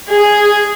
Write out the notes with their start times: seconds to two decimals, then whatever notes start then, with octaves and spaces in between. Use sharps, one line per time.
0.09 G#4